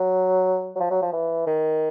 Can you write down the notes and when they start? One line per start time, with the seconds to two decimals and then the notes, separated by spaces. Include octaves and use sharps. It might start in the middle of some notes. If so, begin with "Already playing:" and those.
Already playing: F#3
0.76 F#3
0.80 F3
0.91 F#3
1.02 F3
1.13 E3
1.47 D#3